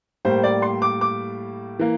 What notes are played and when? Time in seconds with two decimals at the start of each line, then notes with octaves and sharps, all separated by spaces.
0.25 A2 G3 A#3 C5
0.43 D5
0.62 C6
0.82 D6
1.01 D6
1.79 E3 A#3